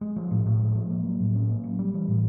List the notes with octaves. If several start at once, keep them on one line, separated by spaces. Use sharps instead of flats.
G#3
F3
A2
A2
G#3
F3
A#3
F#3
A2
C#4
A#3
F#3
G3
E3
A2